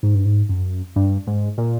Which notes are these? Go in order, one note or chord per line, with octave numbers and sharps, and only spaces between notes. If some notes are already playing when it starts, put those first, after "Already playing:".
G#2
G2
G#2
F#2
G2
G#2
A#2